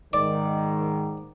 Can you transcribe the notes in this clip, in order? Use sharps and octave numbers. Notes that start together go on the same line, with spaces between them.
G#2 D#3 D5